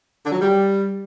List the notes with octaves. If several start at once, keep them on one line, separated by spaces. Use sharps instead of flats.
D3
F#3
G3